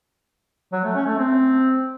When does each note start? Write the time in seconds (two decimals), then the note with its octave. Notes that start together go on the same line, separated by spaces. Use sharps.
0.73 F#3
0.84 A3
0.95 C#4
1.07 A3
1.18 C4